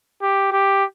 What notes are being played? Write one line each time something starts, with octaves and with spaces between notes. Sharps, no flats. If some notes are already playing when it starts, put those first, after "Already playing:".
G4
G4